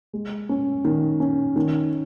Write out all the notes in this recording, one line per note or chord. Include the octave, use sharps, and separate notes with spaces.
G#3
C#4
D#3
C#4
D#3